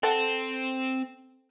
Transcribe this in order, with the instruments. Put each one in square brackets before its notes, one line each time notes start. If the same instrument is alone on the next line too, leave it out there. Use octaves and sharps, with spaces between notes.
[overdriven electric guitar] C4 [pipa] A4 F#5 A5